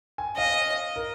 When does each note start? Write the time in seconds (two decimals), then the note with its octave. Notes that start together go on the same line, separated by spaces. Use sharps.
0.18 G#5
0.37 D#5 F5
0.96 A#4